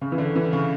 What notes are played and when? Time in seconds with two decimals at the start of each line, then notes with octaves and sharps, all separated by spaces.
0.01 C#3
0.12 E3
0.18 D3
0.35 E3
0.53 C#3